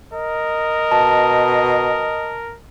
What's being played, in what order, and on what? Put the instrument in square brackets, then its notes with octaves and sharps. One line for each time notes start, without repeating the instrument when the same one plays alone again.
[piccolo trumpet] A#4 [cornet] D#5
[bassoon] B2 [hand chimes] A5